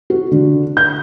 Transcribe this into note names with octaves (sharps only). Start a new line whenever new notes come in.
F#4
D3
G6